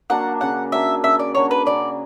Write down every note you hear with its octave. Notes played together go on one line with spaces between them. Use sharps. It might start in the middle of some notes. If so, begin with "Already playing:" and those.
F#3 A#3 D4 F#5
C#3 F#5
F#3 A#3 D4 E5
C#3 E5
D5
F#3 A#3 D4 C#5
B4
C#3 D5